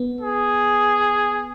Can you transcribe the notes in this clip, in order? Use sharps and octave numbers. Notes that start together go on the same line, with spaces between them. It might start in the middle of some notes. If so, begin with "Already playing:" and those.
Already playing: B3
G#4